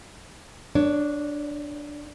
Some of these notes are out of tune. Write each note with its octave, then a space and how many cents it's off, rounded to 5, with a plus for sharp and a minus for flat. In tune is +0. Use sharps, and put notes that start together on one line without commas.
D4 +0 C#5 +25